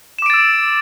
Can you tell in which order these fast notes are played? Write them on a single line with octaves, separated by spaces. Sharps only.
E7 D6 D7 A6 E6